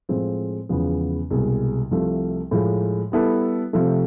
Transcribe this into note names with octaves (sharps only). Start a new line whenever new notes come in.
A2 F3 G#3 C4
E2 C#3 F3 G#3 B3
C2 B2 G#3
C2 C3 F3 A3
A2 F3 G#3
G3 B3 E4 A4
C3 F3 A3